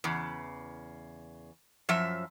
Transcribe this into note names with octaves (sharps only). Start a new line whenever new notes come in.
E2 C#3
F#2 F3 E5